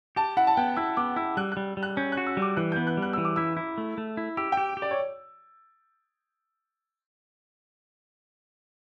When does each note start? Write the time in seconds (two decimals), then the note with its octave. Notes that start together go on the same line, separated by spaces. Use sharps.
0.16 G4 A5
0.37 E4 F#5
0.47 A5
0.57 B3 G5
0.77 E4 E6
0.97 B3 D6
1.16 E4 E6
1.37 G3 F#6
1.52 G3 F#6
1.77 G3
1.83 F#6
1.97 C#4 G6
2.12 F#6
2.17 F#4
2.27 E6
2.37 G3 D6
2.57 E3 F#6
2.72 B3 G6
2.87 F#6
2.97 G3 F#6
3.13 E3 E6
3.25 D6
3.36 E4 E6
3.57 E4
3.78 A3
3.98 A3
4.17 E4
4.37 G4 E6
4.52 G5
4.57 G4
4.77 G4
4.82 D5
4.91 C#5